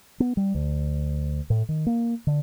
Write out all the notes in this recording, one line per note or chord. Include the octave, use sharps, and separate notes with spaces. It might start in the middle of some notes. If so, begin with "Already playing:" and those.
B3
G3
D2
A2
D#3
A#3
D3